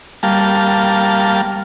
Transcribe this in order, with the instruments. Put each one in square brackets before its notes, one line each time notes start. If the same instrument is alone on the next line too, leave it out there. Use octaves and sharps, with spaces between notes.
[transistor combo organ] G3 A#3 F5 A5